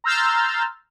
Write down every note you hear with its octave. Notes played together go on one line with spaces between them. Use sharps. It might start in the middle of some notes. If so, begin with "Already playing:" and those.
A#5 C6 E6 F6 G6 A6